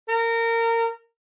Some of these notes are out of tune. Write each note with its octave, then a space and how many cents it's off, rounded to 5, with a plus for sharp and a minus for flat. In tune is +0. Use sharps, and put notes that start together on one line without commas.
A#4 -25